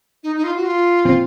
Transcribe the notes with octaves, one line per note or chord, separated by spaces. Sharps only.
D#4
D#4
F4
F#4
F4
A#2 F3 C4